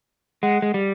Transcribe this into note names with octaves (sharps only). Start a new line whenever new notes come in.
G#3 F#5
G#3
G3